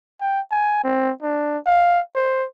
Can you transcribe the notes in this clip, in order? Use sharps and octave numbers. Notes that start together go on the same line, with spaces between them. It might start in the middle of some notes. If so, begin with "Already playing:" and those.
G5
G#5
C4
D4
F5
C5